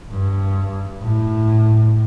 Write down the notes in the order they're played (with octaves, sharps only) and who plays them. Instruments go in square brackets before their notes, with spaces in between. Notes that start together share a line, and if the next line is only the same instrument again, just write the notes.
[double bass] G2
A2